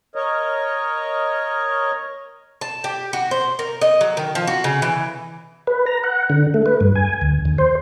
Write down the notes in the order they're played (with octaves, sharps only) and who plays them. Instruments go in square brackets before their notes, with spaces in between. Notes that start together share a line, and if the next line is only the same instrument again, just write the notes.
[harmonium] A#4 C#5 D#5
[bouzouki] A5
G4
F#4
C5
A#4
D#5
F#3
D#3
F3
F#4
C#3
E3
[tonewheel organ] B4
A#5
F#5
D3
A3
B4
G2
G#5
D2
D#2
C5